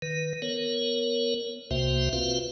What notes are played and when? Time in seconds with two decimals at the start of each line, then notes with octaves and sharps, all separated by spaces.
0.02 D#3 B4
0.42 B3 A#4 C#5
1.71 C2 C3 A#3 F#4 C5 E5
2.13 C4 F4 F#4 B4 F5